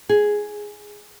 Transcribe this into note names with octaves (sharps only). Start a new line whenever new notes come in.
G#4